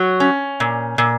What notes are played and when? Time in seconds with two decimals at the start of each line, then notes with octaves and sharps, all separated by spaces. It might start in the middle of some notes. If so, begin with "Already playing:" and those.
Already playing: F#3 F#4
0.20 C#4
0.60 A#2
0.98 A#2